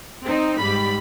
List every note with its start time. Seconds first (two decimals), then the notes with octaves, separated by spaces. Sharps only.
0.24 C4 D#4
0.60 G#2 G3 B5